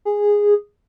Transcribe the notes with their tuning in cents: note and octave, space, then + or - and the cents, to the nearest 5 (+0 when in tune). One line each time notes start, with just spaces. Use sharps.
G#4 -10